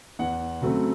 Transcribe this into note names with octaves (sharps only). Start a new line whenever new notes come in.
E2 F#5
C#3 F#3 A3 C4